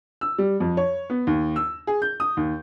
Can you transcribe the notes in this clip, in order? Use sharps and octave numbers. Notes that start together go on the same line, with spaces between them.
E6
G3
F2
C#5
B3
D#2
E6
G#4
G6
D#6
D#2